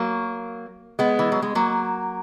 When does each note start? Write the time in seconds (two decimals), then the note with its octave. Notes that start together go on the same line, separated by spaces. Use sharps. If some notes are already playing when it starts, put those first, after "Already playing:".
Already playing: F#3 A#3
0.99 G#3 B3
1.19 E3
1.32 F#3
1.42 G#3
1.55 F#3 A#3